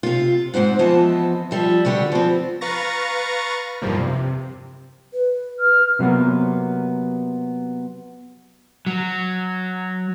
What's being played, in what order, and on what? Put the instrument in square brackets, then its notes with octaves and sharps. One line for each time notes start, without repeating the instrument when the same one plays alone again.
[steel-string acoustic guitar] C3 F4
G#2 C4 C5 F#5
E3 F3 B3 C4 D#5 A5
F3 G3 E5
D3 G3 F#4 B4
F3 C4
[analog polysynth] B4 F5 A#5 C#6 A6 A#6
B1 E2 G2 F3 G3 A#3
C3
[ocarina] B4
[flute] F6
[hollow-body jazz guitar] C3 F#3 A#3 B3
[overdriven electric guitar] F#3